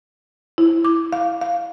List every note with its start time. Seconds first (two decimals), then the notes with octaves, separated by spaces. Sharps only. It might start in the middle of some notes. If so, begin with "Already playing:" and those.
0.58 E4
0.85 D6
1.13 F5
1.41 F5